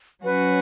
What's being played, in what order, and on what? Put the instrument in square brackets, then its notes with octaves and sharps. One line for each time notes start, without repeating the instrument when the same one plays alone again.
[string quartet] F#3 C#4 F#4 [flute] B4